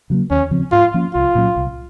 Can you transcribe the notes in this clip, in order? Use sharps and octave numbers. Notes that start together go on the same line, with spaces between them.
C#3 F#3 A#3
D#2 C#4
C#3 F3 C4
G#2 F4
F3 A#3 C#4
C2 F4
A#2 F#3 C#4
C2